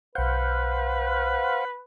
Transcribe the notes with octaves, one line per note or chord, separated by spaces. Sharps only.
B1 B4 C5 F5 F#5 G6